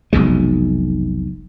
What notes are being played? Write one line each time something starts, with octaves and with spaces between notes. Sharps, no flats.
F1 B1 B2 G#3